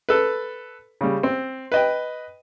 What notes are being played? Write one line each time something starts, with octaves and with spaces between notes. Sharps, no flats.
A4 B4
C#3 G3
C4
B4 D#5 G5